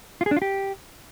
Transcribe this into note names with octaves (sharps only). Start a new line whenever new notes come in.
F4
G#4
D4
F4
G4